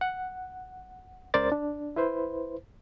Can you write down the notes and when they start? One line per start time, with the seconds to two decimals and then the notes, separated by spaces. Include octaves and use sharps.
0.01 F#5
1.34 C#2 C#3 A#4 C5 D5 A6
1.52 D4
1.96 E4 B4 C5